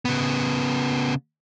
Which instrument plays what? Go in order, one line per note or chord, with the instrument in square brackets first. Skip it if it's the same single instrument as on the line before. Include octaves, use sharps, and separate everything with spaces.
[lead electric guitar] C#3 B3